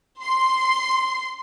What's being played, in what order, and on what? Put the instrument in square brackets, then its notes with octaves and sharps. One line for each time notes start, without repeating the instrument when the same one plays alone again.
[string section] C6